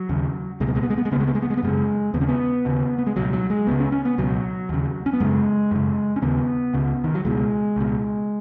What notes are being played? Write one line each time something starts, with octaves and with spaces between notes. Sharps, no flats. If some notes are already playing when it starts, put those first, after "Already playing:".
Already playing: F#3
D#2 C#3
C#2 B2 G#3
B3
G#3
B3
G#3
B3
G#3
C#2 C#3 G#3 B3
B3
G#3
B3
G#3
B3
F#2 C#3 G#3
D#2 C#3 B3
C#4
B3
D#2 C#3
B3
G#3
C#2 B2 F#3
F#3
G#3
C#2 C#3 B3
C#4
C#4
B3
C#2 B2 F#3
D#2 C#3
C#4
B3
F#2 C#3 G#3
F#2 C#3
C#4
D#2 C#3 B3
C#2 C#3
D#3
F#3
C#2 B2 G#3
C#2 B2